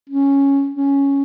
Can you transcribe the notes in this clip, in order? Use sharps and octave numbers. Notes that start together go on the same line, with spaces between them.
C#4
C#4